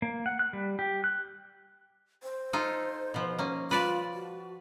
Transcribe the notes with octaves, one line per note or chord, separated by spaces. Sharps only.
A#3
F#5
F#6
G3
G4
F#6
C5
D#4 F4 A4
B2 F3
A#3 C#4
F4 B4 D5 A5
F#4